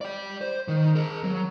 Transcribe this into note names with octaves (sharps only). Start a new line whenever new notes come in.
D5 G5
C5
D#3
G#4 A#4
F#3